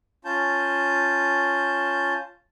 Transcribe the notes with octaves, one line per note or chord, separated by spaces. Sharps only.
C#4 F4 A5 G6